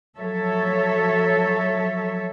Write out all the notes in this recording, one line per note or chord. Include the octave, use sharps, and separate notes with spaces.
F3 F#3 A4 C#5 E5